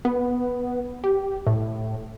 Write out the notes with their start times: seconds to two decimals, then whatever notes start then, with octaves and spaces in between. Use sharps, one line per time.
0.05 B3
1.04 G4
1.47 A2